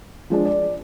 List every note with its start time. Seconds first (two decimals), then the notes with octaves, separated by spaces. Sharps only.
0.30 F3 G#3 D4
0.45 D5